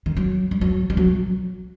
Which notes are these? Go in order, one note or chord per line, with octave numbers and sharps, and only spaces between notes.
D#3
F#3
G3
F#3
G3
F#3